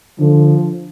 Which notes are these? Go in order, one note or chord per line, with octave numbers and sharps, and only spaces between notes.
D3 F3